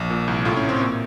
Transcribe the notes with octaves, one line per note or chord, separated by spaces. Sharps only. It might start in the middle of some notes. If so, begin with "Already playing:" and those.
Already playing: A#1
A#2
C2
A2 F4
C#4
A1
C4
A#2